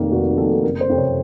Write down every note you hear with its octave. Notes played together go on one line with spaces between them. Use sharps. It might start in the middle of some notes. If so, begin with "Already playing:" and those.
Already playing: F1 F2 D#3 A#3 A#4
F1 F#4
F2 D#3 A#3 A4
F#1 A#4
C5
F2 C3
C#5